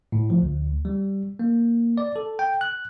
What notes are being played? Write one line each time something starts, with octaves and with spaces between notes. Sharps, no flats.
A2
F3
D2
G3
A#3
D5
A4
G5
F#6